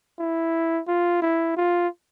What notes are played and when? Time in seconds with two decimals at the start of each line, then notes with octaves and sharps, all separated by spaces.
0.19 E4
0.87 F4
1.22 E4
1.57 F4